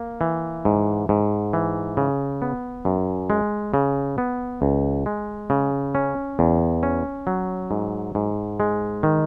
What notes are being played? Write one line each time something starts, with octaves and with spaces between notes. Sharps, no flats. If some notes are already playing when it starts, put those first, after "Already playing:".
Already playing: A#3
E3
G#2
G#2
E3
C#3
B3
F#2
G#3
C#3
B3
C#2
G#3
C#3
C#4
E2
C#4
F#3
G#2
G#2
G#3
D#3